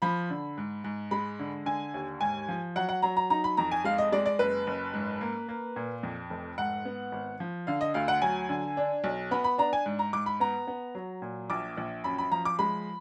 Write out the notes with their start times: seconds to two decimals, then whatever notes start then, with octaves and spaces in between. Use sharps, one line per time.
0.02 F3 B5
0.30 D3
0.58 G#2
0.84 G#2
1.11 G#3 B5
1.39 D3
1.66 D3 G#5
1.94 D#2
2.21 G#2 G#5
2.49 F3
2.76 F#3 F#5
2.89 F#5
3.02 F#3 A#5
3.17 A#5
3.30 D#4 A#5
3.44 B5
3.57 F2 A#5
3.71 G#5
3.84 G#3 F5
3.98 D#5
4.12 G#3 D5
4.26 D5
4.39 F#1 B4
4.67 F#1
4.93 G#2
5.21 A#3
5.49 A#3
5.76 A#2
6.03 F2
6.30 F1
6.58 G#2 F#5
6.85 B3
7.12 G#1
7.40 F3
7.67 D3 F5
7.81 D#5
7.94 D2 F5
8.08 F#5
8.22 F#3 G#5
8.49 D3
8.77 D4
9.04 B1
9.31 B3 B5
9.44 B5
9.58 D4 A#5
9.73 G#5
9.86 G#2
9.99 A#5
10.13 G#2 D6
10.26 B5
10.40 B3 A#5
10.68 B3
10.95 F#3
11.22 A#2
11.50 A#1 D6
11.77 A#1
12.04 F#2 B5
12.18 B5
12.32 F3 A#5
12.45 D6
12.59 G#3 B5